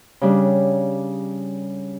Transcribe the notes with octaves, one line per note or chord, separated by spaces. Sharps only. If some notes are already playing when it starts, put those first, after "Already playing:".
C#3 G3 D4